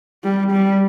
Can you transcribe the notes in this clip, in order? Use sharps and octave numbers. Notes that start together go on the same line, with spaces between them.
G3
G3